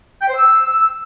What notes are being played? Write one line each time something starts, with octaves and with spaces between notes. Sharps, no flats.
G5
C5
E6